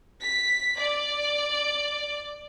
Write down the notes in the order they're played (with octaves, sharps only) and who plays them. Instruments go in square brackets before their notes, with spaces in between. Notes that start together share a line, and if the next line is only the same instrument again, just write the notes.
[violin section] B6
D5